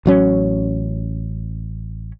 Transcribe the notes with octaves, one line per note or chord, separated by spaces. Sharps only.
A1 F#3 C#4